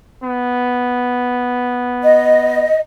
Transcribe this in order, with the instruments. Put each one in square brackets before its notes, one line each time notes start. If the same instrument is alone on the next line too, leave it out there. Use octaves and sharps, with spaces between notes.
[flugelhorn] B3
[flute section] D#5